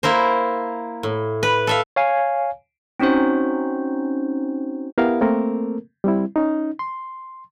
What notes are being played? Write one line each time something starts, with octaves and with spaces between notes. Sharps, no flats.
A#3 E4 A#4 C5
A2
B4
A4 E5 F5
C#5 F5 G#5
C4 C#4 D#4 F#4 C5
B3 E4 G4 A#4 E5 F5
A3 A#3 C4 A4 A#4
G3 C4 E4
C#4 D#4
C6